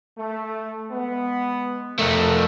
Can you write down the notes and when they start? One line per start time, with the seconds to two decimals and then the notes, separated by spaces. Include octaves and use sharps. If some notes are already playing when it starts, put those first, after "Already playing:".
0.17 A3
0.91 G#3 B3
1.99 F2 A3 A#4